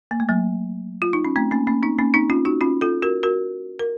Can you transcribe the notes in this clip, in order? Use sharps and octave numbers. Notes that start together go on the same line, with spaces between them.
A#3
A3
F#3 A#3
F4
D#4
C#4
A3 C4
A#3 C#4
A#3 C#4
C4 D#4
A#3 C#4
C4 D#4
C#4 F4
D#4 F#4
C#4 F4
F4 A4
F#4 A#4
F#4 A#4
A#4